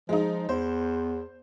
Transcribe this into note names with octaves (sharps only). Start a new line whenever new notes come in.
F3 G#3 D#4
E2 C5